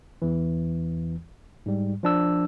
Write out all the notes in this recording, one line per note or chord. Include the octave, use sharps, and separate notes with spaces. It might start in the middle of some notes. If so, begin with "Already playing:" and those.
E2 E3
G#2 G3
F3 D4 E6